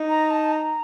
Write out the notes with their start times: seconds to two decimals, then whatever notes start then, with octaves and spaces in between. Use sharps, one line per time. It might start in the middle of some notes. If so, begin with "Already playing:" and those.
Already playing: D#4
0.09 A#5
0.30 A5
0.52 A#5